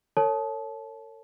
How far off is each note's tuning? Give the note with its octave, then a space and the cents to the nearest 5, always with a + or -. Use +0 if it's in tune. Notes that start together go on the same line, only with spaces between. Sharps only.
A4 +45 C#5 +0 A5 -25